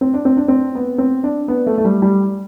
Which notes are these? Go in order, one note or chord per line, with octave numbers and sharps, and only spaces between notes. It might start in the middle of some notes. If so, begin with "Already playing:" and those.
C4
D4
C4
D4
C4
B3
C4
D4
B3
A3
A3
G3
G3